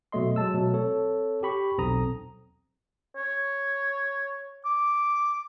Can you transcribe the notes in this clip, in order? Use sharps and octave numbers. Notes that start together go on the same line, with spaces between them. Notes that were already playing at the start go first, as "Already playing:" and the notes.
B2 F#3 A3 D#5 C6
F#3 G#3 A5 E6
B2 F#3 A3
C4 A4 C#5
G4 B5 C#6
B1 E2 C4 A4 A#5 D#6
C#5
D6